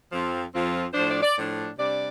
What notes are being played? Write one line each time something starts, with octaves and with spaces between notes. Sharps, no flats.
F2 F3 C4 F4
F2 F3 C4 F4
A2 F3 D4 C5
D5
D5
A2 F3 D4
C3 G3 D4 D5